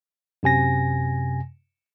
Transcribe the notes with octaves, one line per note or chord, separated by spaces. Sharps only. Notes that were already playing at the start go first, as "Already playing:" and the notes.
F#2 C3 G#5 A#6